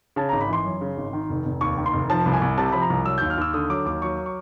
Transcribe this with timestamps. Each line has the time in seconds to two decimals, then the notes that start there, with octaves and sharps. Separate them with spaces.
0.16 C#3 A5
0.29 A#5
0.32 G#1
0.41 B5
0.49 E3 C6
0.65 F#2
0.81 C#3
0.97 G#1
1.13 D#3
1.30 F1
1.45 F1
1.61 D#2 C#6
1.78 D#3
1.86 C6
1.93 F1
2.10 F3 A5
2.26 C2
2.33 G#5
2.42 C2
2.58 C3 A5
2.72 F3 B5
2.82 A#5
2.90 C2
3.05 F#3 E6
3.18 G6
3.21 D#2
3.30 F6
3.38 D#2 E6
3.54 D3 D#6
3.70 F#3 D6
3.85 D#2 D6
4.02 F#3 C#6
4.26 C#6